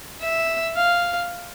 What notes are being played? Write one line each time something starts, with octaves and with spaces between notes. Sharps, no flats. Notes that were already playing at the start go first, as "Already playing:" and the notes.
E5
F5